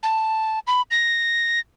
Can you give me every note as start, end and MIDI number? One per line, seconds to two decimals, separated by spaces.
0.03 0.59 81
0.67 0.82 83
0.91 1.59 94